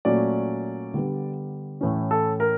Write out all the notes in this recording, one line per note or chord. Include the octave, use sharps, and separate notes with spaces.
A#2 F#3 A3 C#4 D5
D3 G3 B3
A2 E3 A3 C#4
A4
A#4